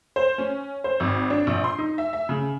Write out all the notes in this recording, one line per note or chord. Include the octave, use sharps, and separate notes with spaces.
C5
C#4
C5
G#1
D4
A#1
C6
D#4
E5
E5
C#3